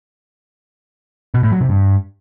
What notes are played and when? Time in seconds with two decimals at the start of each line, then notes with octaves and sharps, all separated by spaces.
1.34 B2
1.43 A2
1.52 F#3
1.60 C3
1.69 G2